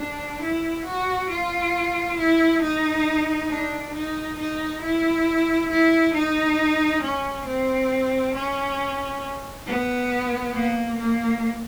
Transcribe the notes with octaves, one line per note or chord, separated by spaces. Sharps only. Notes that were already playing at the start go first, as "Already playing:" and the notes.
Already playing: D4
E4
F#4
F4
E4
D#4
D4
D#4
D#4
E4
E4
D#4
C#4
C4
C#4
B3
A#3
A#3